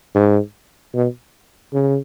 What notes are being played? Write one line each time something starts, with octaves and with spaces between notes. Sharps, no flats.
G#2
B2
C#3